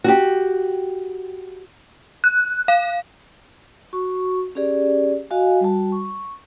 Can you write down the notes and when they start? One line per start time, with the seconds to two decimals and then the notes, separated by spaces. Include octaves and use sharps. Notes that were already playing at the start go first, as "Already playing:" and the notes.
0.04 F#4 G4
2.24 F#6
2.68 F5
3.93 F#4 C#6
4.55 C#4 G4 G#4 D5
5.30 F#4 D#5 F5 G#5
5.61 G3 F#4 A5
5.92 C#6